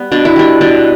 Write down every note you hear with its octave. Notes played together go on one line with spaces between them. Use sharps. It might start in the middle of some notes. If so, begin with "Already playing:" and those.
Already playing: G3 B3
B2 D4
E4
G3 D4
B2 D4